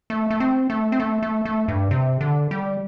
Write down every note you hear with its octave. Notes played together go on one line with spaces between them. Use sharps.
A3
A3
C4
A3
C4
A3
A3
A3
G2
C3
D3
G3